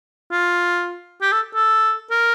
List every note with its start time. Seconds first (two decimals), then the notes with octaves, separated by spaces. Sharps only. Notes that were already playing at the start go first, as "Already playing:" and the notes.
0.31 F4
1.22 G4
1.32 A4
1.55 A4
2.11 A#4